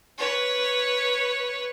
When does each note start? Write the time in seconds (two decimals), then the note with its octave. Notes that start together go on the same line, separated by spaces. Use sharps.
0.18 B4 C#5